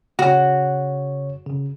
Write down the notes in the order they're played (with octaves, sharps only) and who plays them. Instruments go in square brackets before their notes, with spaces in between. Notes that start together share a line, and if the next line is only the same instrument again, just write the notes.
[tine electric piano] C#3 C#5 [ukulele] F#4
[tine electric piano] C#3